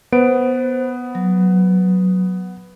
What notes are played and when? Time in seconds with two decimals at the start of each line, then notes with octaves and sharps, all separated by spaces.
0.12 B3 B4 C5 D7
1.15 F#3